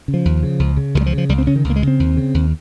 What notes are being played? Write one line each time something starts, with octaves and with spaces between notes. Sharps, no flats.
C#3
F3
D#2
C#3
C#2
C#3
C#2 D#3
G3
F3
C#3
F3
C#2 G3
C4
C#3 C#4
D#3
C#2
A#3
G#3
C#3
C4
D#2
C#3
D#2